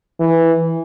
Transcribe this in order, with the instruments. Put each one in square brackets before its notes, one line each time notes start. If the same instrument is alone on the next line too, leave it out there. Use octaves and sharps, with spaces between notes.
[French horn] E3